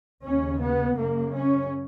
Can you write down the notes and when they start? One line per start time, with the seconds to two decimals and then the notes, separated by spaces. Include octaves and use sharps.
0.25 D#2 C#3 C#4
0.61 B3
0.98 F#2 C#3 A#3
1.34 C#4